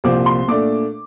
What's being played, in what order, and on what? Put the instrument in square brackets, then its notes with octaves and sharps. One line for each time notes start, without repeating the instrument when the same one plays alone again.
[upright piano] C2 A#2 F3 C4 D6
C6
A#2 A3 D4 D6